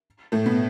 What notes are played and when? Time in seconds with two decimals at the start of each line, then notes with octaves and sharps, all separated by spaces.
0.32 A2 A3
0.46 B2 B3